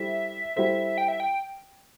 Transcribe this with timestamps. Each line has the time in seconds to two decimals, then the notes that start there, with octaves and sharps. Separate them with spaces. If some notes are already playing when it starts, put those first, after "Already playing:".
Already playing: G3 E4 A4 C5 E5
0.56 G3 E4 A4 C5 E5
0.98 G5
1.08 E5
1.20 G5